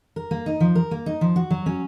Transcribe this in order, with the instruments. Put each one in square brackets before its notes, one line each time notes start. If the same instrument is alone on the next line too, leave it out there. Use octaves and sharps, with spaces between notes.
[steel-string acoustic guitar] A#4
A#3
D#4
F3
A#4
A#3
D#4
F3
F#4
F#3
C#4